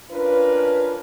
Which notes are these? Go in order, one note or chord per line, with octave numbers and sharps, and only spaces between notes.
C#4 D4 F4 A#4 B4